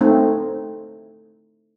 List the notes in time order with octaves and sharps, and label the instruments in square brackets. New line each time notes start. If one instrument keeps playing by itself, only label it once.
[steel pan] A3 C4 D#4